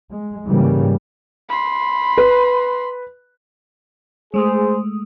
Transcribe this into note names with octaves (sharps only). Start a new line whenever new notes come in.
G#3
G#2 C#3 E3 G3 A#3
B5 C6
B4
G#3 A3 G#4 C5 D#6